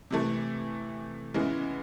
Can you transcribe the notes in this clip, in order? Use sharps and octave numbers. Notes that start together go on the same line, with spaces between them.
C3 E3 A3
C#3 E3 G#3 B3 E4